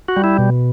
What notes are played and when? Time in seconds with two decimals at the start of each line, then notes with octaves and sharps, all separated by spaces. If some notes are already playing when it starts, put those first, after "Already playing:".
0.08 F#4
0.16 G3
0.24 E4
0.38 B2